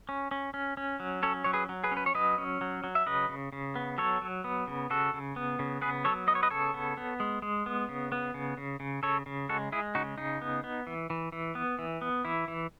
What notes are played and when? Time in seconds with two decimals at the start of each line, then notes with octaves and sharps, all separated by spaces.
0.09 C#4
0.31 C#4
0.54 C#4
0.77 C#4
1.00 F#3
1.23 C#4 A4 C#5
1.44 F#3 C#5
1.53 G#4 B4
1.69 F#3
1.84 G#4 B4
1.91 C#4
1.97 B4
2.06 C#5
2.14 F#3 B4 D#5
2.38 C#4
2.61 F#3
2.84 F#3
2.95 E5
3.06 C#3 B4 D#5
3.29 C#3
3.52 C#3
3.75 B3
3.98 F#3 A4 C#5
4.22 F#3
4.44 B3
4.67 C#3
4.90 C#3 F#4 A4
5.14 C#3
5.36 B3
5.59 C#3
5.81 B3 G#4 B4
6.04 F#3 A4 C#5
6.27 B3 D#5
6.35 C#5
6.43 B4 D#5
6.50 C#3 A4 C#5
6.74 B3
6.97 B3
7.20 G#3
7.42 G#3
7.66 B3
7.89 C#3
8.12 B3
8.34 C#3
8.57 C#3
8.80 C#3
9.03 C#3 A4 C#5
9.26 C#3
9.49 G#3 F#4 A4
9.72 G#3 E4 G#4
9.95 C#3 D#4 F#4
10.18 C#3 D#4
10.42 B3
10.64 B3
10.87 E3
11.10 E3
11.32 E3
11.55 B3
11.79 E3
12.01 B3
12.25 E3 E4
12.48 E3